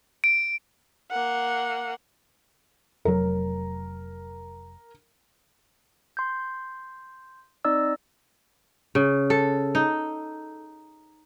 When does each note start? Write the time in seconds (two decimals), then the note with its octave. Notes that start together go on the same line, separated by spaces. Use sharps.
0.24 D7
1.11 A#3 F#5
3.05 F1 F#3 A#4
6.17 C6 G6
7.65 C4 D#4 D5 D#5 E6
8.95 C#3
9.30 A4
9.75 D#4